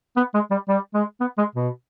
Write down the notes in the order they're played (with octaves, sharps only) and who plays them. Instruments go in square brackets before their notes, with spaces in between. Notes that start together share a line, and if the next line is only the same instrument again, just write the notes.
[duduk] B3
G#3
G3
G3
G#3
B3
G#3
B2